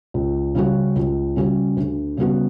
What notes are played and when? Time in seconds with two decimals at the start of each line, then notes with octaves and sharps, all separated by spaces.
0.14 C#2
0.55 C#3 G3 C#4 F#4
0.96 C#2
1.36 C#3 G3 C#4 F#4
1.77 D2
2.17 C#3 G3 B3 F#4